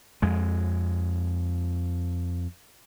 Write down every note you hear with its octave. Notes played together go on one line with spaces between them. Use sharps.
F2 G#3